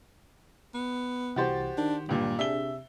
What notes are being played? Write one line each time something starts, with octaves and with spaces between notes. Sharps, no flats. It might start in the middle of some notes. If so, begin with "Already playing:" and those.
B3
C2 E3 F#4 G4 C5 A6
D#3 D4
C#2 G2 A#2
C3 D4 G#4 E5 G7